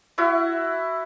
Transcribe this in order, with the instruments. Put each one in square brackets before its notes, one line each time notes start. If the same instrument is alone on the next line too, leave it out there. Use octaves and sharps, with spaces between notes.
[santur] E4 F#4 E5